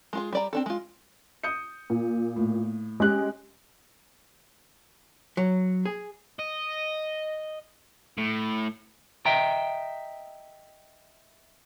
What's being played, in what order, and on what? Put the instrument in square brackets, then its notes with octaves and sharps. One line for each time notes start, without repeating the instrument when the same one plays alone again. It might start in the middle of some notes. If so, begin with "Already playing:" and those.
[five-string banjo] G#3 F4 G#4
G3 D5 A#5
C4 D4 A4
G#3 F4
[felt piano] D#6 G6 C#7
[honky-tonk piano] A#2
[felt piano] A2
[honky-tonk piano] G#3 [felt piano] C#4 G4 F#6
[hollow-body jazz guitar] F#3
G#4
[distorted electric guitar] D#5
A2
[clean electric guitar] D#5 E5 G5 A#5